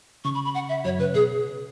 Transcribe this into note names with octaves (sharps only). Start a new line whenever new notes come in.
C#3 C#6
B5
B5
F#5
E5
F#2 F#3 C#5
C#3 B4
B2 G#4